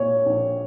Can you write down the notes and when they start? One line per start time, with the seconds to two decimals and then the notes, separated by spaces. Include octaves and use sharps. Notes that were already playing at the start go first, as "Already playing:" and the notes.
Already playing: A#2 C#5
0.26 A#1